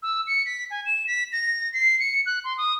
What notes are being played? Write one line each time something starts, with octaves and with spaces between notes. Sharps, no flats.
E6
C#7
B6
G#5
E7
B6
A#6
C7
C#7
F#6
C6
D#6